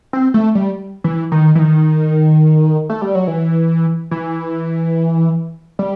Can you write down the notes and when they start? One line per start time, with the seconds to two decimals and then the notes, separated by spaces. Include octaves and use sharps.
0.13 C4
0.34 A3
0.55 G3
1.04 E3
1.32 D#3
1.55 E3
1.59 D#3
2.90 A3
3.02 G3
3.15 F#3
3.27 E3
4.11 E3
5.79 G3